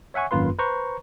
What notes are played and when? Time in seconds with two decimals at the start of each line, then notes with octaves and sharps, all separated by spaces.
0.14 C#5 E5 F#5 G#5 C#6
0.31 G#1 F#2 A#3 F4 B4 C6
0.59 B4 C5 A#5 C#6